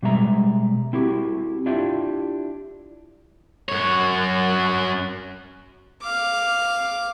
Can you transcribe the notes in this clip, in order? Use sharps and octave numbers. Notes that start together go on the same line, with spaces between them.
B2 G3 G#3 E5 A#5
C4 E4 F#4 G4
D4 E4 F4 G4 E5
F#2 C#5
F5 D6